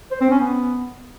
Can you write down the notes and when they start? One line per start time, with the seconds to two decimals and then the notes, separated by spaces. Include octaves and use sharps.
0.11 C5
0.21 C4
0.31 C#4
0.40 B3